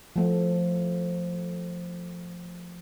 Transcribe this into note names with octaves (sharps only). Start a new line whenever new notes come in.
F3 A3